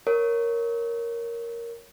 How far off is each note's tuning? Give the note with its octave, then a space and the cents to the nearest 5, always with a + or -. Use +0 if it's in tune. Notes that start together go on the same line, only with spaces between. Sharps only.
A#4 +0 C#5 +0